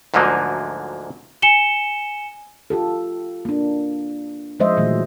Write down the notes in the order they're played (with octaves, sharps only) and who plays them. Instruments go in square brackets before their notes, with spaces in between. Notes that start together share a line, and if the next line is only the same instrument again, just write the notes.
[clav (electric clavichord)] D2 G#2 D3 F3 F#3 A#3
[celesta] G#5 C#7 E7 G7
[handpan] F4 G4 A4
A#3 D4
F3 G#3 C5 D#5 E5
A#2 D#3 E3 F#3 A3